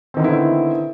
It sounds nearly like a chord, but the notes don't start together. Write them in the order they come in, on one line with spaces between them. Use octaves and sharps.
C4 D#3 D3 B3 E4